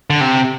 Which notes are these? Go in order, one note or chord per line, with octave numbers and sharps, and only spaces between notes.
D3
C3